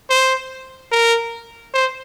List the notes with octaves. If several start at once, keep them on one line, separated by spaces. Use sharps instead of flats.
C5
A#4
C5